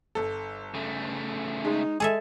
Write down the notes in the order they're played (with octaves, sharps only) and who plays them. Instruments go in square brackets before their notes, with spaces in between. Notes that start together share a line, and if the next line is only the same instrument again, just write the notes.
[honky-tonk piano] G1 A4
[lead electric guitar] C#3 A3
[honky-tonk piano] G#3 [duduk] D#4
[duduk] G#3 [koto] G#4 A4 E5 [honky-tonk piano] G#5